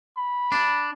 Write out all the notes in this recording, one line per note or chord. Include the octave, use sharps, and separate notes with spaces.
B5
D4